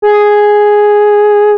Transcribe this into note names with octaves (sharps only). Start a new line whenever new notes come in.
G#4